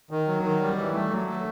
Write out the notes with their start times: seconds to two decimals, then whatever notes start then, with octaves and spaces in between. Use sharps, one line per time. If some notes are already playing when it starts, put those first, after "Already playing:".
0.11 D#3
0.28 F#3
0.43 D#3
0.61 G3
0.78 E3
0.93 A3
1.11 F#3
1.28 A3